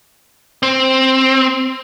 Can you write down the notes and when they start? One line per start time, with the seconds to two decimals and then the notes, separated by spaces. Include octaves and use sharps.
0.63 C4